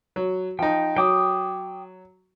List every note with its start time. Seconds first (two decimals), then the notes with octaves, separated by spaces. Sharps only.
0.16 F#3
0.59 F3 D#4 G5
0.96 F#3 G5 D6 D#6